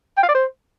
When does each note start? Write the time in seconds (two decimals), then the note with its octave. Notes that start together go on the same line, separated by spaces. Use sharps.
0.17 G5
0.23 F5
0.29 D5
0.35 C5